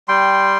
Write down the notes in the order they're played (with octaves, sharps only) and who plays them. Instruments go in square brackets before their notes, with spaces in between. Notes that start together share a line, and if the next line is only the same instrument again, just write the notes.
[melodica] G3 G5 C6